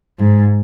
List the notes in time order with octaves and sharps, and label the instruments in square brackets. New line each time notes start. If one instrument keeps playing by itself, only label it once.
[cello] G#2